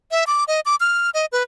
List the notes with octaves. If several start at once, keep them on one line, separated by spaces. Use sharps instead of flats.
E5
D6
D#5
D6
F6
D#5
B4